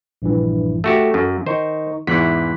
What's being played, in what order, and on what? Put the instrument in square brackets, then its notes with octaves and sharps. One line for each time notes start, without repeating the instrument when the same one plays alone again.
[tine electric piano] A#1 G2 E3
[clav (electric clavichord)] A3 F#4 G4 [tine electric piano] A4
[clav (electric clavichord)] F#2
[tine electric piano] D#3 D#4 C#6 [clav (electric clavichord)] C5
[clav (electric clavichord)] E2 G#2 E3 [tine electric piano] B5 F#6 B6